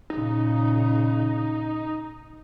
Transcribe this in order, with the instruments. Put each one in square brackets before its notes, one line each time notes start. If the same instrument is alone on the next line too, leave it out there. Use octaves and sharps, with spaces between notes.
[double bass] A#2 C#3 [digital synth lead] D#4